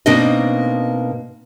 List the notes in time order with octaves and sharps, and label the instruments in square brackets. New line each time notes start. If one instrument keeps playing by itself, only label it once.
[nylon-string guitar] B2 A#3 C4 D4 D#4 D#5